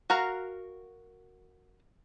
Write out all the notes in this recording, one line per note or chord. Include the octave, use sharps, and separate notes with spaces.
F#4 A#4 F5 F#5 A#5